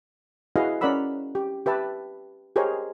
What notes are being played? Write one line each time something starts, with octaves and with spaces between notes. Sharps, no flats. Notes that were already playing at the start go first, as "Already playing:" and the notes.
E4 F#4 G#4 B4 D#5 F5
C#4 A#4 D5 F#5 B5 E6
G4
G4 B4 E5 A5
G4 G#4 A#4 C5 C#5 D#5